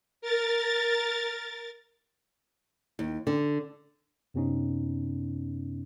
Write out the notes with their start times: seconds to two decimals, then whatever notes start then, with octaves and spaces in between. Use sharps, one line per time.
0.21 A#4 A6
2.99 D#2
3.27 D3
4.34 F#2 C3 B3 C#4 D#4